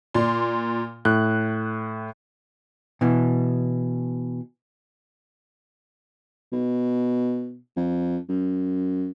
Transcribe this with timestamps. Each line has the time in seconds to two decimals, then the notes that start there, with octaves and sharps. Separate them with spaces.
0.14 A#2 D5 C6
1.05 A2 F#6
3.01 B2 E3
6.52 B2
7.76 F2
8.29 F#2